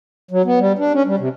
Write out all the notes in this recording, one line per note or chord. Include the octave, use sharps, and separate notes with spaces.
F#3
B3
G3
D4
C#4
G3
C3